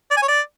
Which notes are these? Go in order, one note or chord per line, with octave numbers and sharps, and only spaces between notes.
D5
G#5
C#5
D5